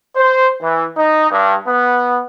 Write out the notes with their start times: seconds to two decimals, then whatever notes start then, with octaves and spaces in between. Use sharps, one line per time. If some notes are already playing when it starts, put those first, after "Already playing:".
0.16 C5
0.62 E3
0.97 D#4
1.31 G2
1.68 B3